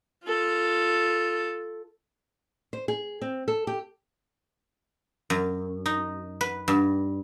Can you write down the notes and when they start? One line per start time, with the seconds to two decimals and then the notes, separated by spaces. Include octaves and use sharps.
0.25 F4 A4
2.73 C5
2.88 G#4
3.21 C4
3.48 A4
3.67 G4
5.30 F#2
5.86 D#4
6.41 B4
6.68 G2